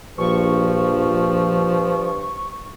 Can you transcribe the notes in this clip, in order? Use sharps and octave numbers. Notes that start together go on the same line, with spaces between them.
A#1 G2 F3 C#6